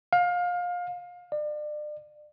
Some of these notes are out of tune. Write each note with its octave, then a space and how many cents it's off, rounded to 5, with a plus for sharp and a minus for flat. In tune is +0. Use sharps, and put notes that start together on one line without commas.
F5 +25
D5 +35